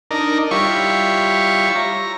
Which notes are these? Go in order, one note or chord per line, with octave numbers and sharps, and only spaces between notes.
D4 D#4 A#4
G3 E4 F4 C#5 C#6
A#5